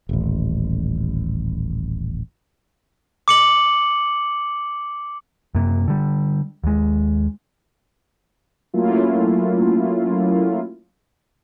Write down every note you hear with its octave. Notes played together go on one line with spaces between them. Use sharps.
D#1 A1
D6 C#7 F#7
F#2 C3 A#3
D3 G3
D#2 G#3
F#3 A3 A#3 C#4 E4 F4